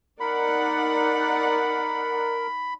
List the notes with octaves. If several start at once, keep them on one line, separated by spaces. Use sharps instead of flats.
D#4 A#4 D5 F#5 B5